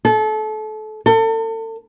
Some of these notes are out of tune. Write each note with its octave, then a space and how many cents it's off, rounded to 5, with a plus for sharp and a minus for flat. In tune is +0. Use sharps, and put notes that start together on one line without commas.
A4 -30
A4 +35